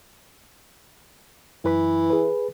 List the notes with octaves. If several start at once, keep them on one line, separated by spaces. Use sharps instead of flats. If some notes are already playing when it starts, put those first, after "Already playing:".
F#2 E3 B4 B5
G#4 B4